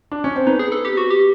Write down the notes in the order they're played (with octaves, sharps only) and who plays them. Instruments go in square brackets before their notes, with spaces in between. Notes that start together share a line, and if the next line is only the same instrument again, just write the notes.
[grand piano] D4
C#4
C4
[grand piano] B3 [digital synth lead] D#4
[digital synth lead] G#4
A4
G4
F#4
G4